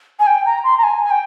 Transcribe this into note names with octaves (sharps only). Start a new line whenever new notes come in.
G#5
G5
A#5
C6
A#5
G#5
G#5
G5